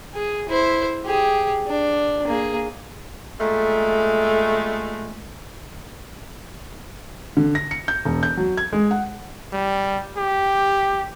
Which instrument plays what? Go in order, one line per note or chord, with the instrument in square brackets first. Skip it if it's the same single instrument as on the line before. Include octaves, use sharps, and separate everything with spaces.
[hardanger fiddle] G#4
E4 C5
G4 G#4
D4
A#3 G#4
[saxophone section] A#2 G#3 A3
[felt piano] D3
A#6
C#7
G6
E1
G6
F#3
G#6
G#3
F#5
[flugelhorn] G3
G4